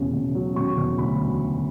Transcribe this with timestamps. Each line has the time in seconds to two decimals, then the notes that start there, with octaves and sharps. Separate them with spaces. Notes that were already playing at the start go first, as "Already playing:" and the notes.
Already playing: E1 C#3
0.13 C#3
0.35 F#3
0.56 C#3 C#6
0.77 E1
0.98 D2 B5